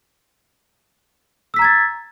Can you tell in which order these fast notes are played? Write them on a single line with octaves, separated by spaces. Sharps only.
E6 B6 A#5 G#6 A6